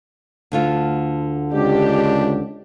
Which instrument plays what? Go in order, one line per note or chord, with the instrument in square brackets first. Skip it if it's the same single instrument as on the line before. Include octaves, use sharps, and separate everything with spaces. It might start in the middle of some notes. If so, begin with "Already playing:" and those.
[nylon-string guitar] D2 D3 F4
[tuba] C#2 [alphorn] D4 [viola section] G4